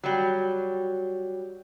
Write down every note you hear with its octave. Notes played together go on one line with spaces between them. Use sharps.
F#3 G3 F#4